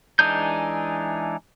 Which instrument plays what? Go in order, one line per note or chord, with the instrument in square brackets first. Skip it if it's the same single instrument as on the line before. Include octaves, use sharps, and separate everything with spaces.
[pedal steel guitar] E3 G#3 D4 D#4 G6